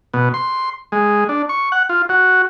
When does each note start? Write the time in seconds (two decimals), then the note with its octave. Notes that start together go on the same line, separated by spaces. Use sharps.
0.14 B2
0.34 C6
0.92 G#3
1.29 D4
1.49 C#6
1.72 F#5
1.89 F4
2.09 F#4